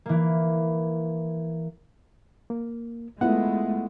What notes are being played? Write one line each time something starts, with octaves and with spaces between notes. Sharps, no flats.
E3 A#3
A#3
G#3 A3 B3 E4 F4 F#5